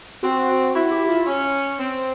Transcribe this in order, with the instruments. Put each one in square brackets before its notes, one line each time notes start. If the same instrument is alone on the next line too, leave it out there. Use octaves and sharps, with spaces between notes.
[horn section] C4 [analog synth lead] F#4
[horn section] E4 [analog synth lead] F#4
[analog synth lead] G4
F4
[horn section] C#4
C4